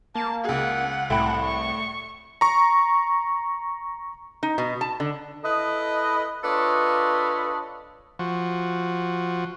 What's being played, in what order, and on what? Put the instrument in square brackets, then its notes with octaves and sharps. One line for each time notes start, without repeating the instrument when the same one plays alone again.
[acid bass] A#3 [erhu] A5
[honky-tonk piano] C#2 G#4 [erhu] F#5
[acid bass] C2 [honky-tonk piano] A2 [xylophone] E5 G5 B5
[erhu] C#6
[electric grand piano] A#5 C#6
[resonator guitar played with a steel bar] D#4
B2
A5
D3
[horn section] E4 A4 B4 D#5
D4 F4 A4 B4 C#5 D#5
[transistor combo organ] F3 F#4